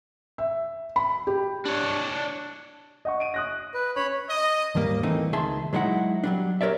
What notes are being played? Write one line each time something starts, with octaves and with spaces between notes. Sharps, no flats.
E5
B5
G4
D4 C#5
D#5 F#5 C#6
D7 D#7
D#6 F#6 A#6
B4
C#4 C#5 B5
D#5
D#2 G#2 G3 A#3
E3 A3 A#3 C4 D#4
C#2 D#3 G#4 E5 A5 C6
F#3 G#3 D#4 E4 F#5
F#3 G3 D4
G4 A#4 C#5 D5 E5